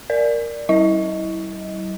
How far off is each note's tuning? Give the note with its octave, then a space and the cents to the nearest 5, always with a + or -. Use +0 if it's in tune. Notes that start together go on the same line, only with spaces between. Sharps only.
A#4 +0 D5 +0
G3 -45 E4 -25 D#5 +15